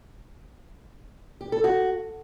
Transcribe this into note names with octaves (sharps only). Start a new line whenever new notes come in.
G4
A4
F#4